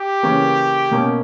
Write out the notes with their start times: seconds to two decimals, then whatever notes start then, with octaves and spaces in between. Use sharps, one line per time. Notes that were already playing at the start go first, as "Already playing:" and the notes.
Already playing: G4
0.23 C#3 E3 A#3 C#4
0.91 B2 A#3 C#4